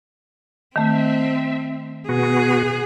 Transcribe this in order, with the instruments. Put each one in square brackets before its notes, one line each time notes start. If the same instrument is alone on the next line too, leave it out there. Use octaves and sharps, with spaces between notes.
[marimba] D#3 A3 [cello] C4 [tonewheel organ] E5
[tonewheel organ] B2 B3 F#4 [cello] G#4